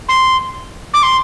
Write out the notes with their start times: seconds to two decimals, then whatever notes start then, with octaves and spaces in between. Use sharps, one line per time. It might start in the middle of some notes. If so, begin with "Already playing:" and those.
0.09 C6
0.94 D6
1.03 C6